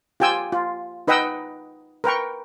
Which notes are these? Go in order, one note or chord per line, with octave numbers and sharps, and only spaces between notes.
F4 G4 G5 G#5 E6
F4
D#4 B4 D#5 F#5 G5 E6
A#4 B4 G5 C#6